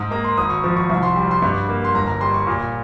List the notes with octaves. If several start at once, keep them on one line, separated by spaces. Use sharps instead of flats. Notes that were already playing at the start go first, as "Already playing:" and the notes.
Already playing: G#2 D#6
A#3 A#5
C6
G#1 D#6
C#6
F3 C#6
C#6
C2 C#6
C6
G3
C6
G2 C#6
A#3
C6
G1 A#5
A#5
G3 C6
C#6
A#2